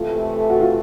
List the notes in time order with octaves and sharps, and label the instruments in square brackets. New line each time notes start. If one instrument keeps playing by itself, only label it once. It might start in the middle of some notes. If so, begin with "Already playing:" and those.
Already playing: [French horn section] C3 E3 A3 [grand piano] F4
[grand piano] F#4
F4